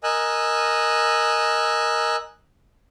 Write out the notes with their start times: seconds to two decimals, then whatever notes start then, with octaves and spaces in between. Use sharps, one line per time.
0.04 A#4 D#5 G#5 E6 F#6